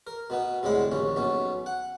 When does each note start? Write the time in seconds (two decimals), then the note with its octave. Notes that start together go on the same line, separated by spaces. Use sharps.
0.07 A#4
0.30 B2 B3 D#4
0.63 C2 A2 D3 G#3 B5
0.92 A#1 D#2 C#4
1.16 B1 B2 C#4
1.66 F#5